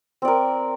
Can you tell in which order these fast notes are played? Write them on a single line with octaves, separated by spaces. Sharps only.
C4 D5 A#4